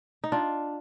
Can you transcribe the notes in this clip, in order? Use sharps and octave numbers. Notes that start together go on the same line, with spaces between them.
D#4
D4 F4